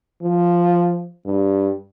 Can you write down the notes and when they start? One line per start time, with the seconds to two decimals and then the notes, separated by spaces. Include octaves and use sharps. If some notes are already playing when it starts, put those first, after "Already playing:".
0.22 F3
1.26 G2